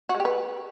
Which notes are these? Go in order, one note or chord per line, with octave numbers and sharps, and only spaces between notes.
F#4
G#3
G4
B4